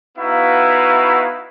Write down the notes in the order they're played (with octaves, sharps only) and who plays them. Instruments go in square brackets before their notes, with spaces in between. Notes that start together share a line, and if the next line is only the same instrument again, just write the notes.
[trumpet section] B3 D#4 E4 F#4 E5 F5